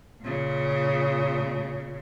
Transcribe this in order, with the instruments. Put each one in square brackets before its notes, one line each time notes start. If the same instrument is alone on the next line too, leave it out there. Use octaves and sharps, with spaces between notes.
[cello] A#2 C#3